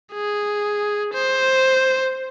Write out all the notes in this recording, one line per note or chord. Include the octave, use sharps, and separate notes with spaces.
G#4
C5